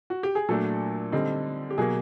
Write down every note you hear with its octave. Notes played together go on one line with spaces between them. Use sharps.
F#4
G4
G#4
A#2 F#3 A3 D4 A4
D3 G3 C4 D#4
G4
B2 F#3 A#3 G#4